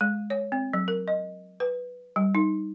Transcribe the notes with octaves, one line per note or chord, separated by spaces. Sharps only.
G#3
C#5
C4
F#3
A#4
D#5
B4
G3
D#4